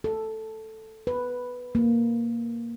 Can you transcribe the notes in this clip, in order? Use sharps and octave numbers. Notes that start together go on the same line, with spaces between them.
A4
B4
A#3